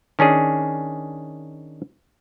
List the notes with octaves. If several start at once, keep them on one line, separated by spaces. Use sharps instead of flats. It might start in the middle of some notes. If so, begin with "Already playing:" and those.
D#3 C#4 D4 G#4